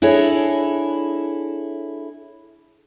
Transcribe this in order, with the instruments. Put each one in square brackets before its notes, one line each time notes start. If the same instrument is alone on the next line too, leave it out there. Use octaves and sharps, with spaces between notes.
[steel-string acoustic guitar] D4 E4 G#4 A4 C#5 D#5